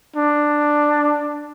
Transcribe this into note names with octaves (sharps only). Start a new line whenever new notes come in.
D4